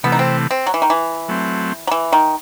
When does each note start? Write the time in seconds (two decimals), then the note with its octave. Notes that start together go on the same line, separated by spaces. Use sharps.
0.03 C3 E3 A3 B3
0.12 D#4
0.19 C4
0.51 C4
0.67 F#3
0.74 E3
0.82 D#3
0.90 E3
1.28 F#3 A3 C4
1.87 F#3
1.91 E3
2.12 D#3